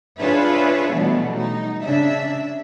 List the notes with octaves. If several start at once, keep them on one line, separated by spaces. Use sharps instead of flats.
D4 F4 G#4 B4 C#5 E5
B2 E3 F#3 G3 A3 B3
D#4
C#3 D4 E5